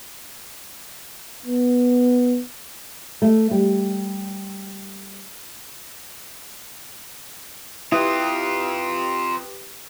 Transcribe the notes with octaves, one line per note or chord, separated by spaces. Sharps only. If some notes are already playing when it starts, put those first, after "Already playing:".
B3
A3
G3
C4 E4 F4 G4 B4 D#6